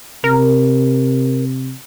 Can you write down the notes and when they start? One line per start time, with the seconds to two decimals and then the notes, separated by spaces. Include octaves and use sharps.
0.24 C3 A#4